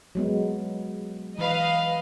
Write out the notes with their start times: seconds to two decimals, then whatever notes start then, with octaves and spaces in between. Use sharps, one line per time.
0.15 F#3 G#3 B3
1.38 E3 B4 D#5 F5